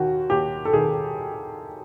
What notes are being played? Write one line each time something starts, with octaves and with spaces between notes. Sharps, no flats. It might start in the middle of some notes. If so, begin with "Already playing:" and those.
Already playing: D#2 D#3 F#4
D#2 G4
A4
D#3 G#4